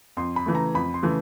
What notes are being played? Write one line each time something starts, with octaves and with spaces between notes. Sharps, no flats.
F2 C6
B5
C#3 E3 A3
A#5
F2 B5
C6
C#3 E3 A3